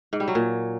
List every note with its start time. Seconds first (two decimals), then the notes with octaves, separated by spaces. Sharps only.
0.13 G#2
0.20 G3
0.28 F#3
0.35 A#2